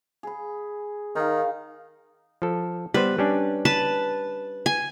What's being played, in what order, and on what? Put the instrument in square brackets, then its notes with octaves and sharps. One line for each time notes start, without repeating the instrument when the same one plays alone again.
[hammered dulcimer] G#4 B5
[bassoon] D#3 [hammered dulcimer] D#4 F5
[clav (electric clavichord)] F3 A4
[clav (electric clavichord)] G3 B3 C5 [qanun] B4
[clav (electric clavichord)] G3 C#4 D4
[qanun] B4 A5
G#5